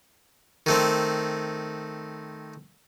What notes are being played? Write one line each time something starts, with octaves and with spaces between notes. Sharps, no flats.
D#3 A3 C4